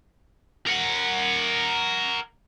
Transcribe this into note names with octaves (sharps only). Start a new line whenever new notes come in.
A#4 F#5